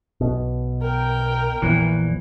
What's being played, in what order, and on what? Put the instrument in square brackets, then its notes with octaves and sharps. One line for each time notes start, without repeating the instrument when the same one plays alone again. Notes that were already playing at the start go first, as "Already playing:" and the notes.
[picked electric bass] B1 B2
[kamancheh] A#4 G5
[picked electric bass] A#1 [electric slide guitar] E2 E3